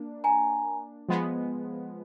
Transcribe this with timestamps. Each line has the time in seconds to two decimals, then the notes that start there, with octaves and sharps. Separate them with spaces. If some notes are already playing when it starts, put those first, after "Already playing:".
Already playing: A#3 D4
0.24 G#5 A#5
1.09 F3 G#3 B3